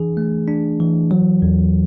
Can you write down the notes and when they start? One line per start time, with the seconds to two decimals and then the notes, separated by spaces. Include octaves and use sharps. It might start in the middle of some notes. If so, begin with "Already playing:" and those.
Already playing: E3 D4 G#4
0.17 A3
0.48 D4
0.80 E3
1.11 F#3
1.42 E2